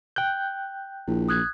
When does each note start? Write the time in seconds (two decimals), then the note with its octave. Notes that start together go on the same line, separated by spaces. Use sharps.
0.16 G5 F#6 G6
1.08 A#1 E4
1.29 D#6 F#6 G#6